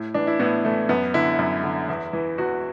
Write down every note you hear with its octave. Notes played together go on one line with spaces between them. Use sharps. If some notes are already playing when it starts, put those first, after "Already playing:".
Already playing: A2
E3 D4
E4
A2 B3
E3 A3
F#2 B3
D3 E4
F#2
D3
E2
E3
E2 F#4